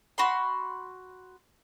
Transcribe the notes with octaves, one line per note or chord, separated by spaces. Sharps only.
F#4 B5 C6